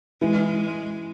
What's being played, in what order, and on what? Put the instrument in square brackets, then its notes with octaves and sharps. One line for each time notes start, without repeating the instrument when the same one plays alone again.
[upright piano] E3 [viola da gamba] G#3